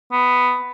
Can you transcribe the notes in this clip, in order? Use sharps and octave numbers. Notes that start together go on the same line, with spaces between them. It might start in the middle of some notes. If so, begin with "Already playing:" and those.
B3